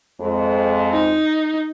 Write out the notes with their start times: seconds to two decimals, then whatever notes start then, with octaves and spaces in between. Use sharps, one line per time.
0.21 F2 G#3
0.92 D#4